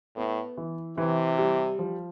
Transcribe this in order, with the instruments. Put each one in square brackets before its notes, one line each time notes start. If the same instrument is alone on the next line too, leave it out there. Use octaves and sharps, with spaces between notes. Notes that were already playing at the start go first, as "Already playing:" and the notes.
[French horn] A2 [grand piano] B3
[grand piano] E3
[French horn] C3 [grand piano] E3
[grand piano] G3
F3